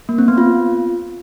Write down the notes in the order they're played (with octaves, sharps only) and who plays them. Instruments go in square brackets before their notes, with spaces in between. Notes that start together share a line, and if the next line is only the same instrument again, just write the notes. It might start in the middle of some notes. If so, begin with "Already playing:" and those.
[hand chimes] A#3
C4
B3
F4